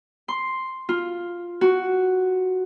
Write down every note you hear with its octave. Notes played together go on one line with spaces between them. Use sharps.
C6
F4
F#4